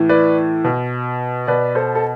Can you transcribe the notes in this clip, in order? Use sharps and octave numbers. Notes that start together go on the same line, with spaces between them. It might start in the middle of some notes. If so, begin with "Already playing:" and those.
Already playing: A2 E3
B4 D5
B2
B2 B4 D5
A4 C5
A4